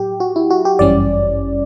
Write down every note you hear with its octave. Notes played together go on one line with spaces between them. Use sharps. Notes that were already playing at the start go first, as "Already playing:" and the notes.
Already playing: A2 F#3 G4
F#4
E4
F#4
G4
G1 F#2 E3 G3 C#4 D5